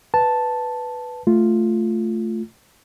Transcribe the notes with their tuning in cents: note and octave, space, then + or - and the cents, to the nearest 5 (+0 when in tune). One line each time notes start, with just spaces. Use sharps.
B4 +0 A5 +0
A3 +0 F4 +0